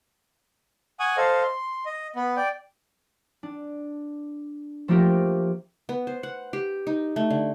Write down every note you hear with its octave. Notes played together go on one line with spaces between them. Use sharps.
F#5 G#5 C#6 D#6
A4 C5 D#5 F5
C6
D#5
B3
D5 G5
D4
F3 A3 A#3 F4 G4 A#4
B3
C5
F#5
G4
D#4
A3
D3